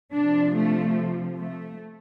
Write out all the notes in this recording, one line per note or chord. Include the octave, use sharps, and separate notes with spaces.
C3 F3 D4
A3
A3